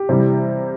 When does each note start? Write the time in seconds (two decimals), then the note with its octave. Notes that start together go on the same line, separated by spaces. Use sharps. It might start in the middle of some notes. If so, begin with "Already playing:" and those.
Already playing: G4
0.09 C3 E3 G3